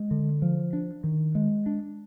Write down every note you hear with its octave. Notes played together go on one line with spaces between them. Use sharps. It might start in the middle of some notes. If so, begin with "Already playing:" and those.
Already playing: G#3
D3
F3
D4
D#3
G#3
D4